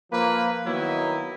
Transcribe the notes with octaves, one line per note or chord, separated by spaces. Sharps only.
F3 A#3 B4
D#3 F#3 A#3 B3 D#4 E4